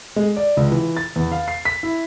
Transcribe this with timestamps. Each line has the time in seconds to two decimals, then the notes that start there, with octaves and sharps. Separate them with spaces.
0.16 G#3
0.36 D5
0.57 C#2
0.72 E3
0.97 A6
1.16 E2
1.32 F5
1.48 C7
1.65 B6
1.83 E4